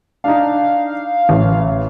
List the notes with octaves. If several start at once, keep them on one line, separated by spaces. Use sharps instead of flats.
D4 D#4 F5
A1